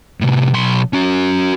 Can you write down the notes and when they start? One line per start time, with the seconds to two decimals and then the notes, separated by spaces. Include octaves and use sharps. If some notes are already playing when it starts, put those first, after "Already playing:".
0.21 A2 C3
0.54 B1 C6
0.93 C#4 F#4